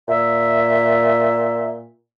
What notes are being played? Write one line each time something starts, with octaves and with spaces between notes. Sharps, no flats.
A#2 E5